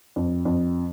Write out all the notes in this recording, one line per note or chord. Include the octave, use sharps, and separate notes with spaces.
F2
F2